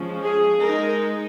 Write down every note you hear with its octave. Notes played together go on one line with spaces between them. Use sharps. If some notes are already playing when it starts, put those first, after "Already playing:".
Already playing: F3 G#3 C#4
G#4
G#3 D#4 A#4